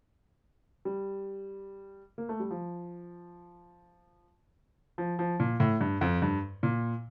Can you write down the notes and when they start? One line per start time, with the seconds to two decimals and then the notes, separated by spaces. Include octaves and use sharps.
0.85 G3
2.18 A#3
2.29 A3
2.40 G3
2.51 F3
4.98 F3
5.19 F3
5.40 A#2
5.60 A2
5.81 G2
6.01 F2
6.22 G2
6.63 A#2